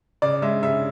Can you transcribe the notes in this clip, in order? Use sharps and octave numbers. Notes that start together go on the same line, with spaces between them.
C#3 D5
G#3 E5
C#3 E5